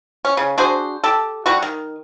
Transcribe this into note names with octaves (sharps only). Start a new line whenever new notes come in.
C#4
C#3
D4 F#4 G#4 C5
G4 A4
D3 G3 F#4
D#3